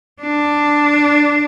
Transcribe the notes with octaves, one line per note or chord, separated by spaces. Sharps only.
D4